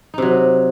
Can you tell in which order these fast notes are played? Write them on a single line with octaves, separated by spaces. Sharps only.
D#4 C3 F#3